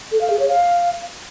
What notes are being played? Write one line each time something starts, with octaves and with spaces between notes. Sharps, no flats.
A4
F5
G#4
C#5
F5